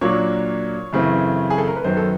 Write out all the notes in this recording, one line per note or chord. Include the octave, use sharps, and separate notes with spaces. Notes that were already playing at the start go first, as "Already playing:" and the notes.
A#2 F#3 A#3 D4 C#5
F#2 C#3 E3 A3 C4
G#4
A4
A#4
B4
F#2 D#3 F#3 B3 C5
A4